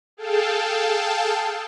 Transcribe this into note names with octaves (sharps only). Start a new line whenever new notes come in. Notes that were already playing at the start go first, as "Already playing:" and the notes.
G#4 A4 F5 G5 A5